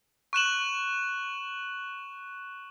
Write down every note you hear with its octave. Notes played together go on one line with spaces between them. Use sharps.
C#6 F#6 E7 F#7